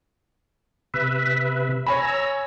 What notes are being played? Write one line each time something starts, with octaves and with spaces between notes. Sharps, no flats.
C3 B4 E5
C#5 G#5 A#5 B5 E6